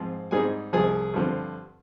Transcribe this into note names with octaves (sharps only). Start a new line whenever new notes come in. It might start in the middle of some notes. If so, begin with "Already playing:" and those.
Already playing: G#2 F3 C4
G#2 G3 C4 D#4 G#4 G#5
C2 C3 F3 G#4 G#5
G2 D3 F3 C4